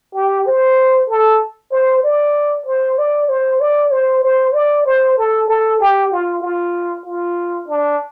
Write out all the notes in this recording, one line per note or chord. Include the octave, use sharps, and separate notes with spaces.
G4
C5
A4
C5
D5
C5
D5
C5
D5
C5
C5
D5
C5
A4
A4
G4
F4
F4
F4
D4